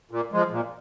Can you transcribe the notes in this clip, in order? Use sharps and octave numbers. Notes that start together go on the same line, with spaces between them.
A#2
F3 G#3
A#2